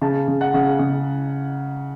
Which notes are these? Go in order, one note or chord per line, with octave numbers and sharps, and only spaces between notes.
C#3 A5
C#3
F#5
C#3
C#3